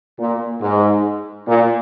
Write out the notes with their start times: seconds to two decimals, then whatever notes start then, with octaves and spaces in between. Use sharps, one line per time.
0.18 A#2
0.61 G#2
1.47 A#2